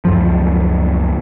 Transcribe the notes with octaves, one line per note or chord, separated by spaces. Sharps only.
C#2 F#2 F3